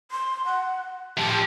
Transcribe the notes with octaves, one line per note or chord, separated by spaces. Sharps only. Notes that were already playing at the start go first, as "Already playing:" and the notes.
C6
F#5
A2 F3 G4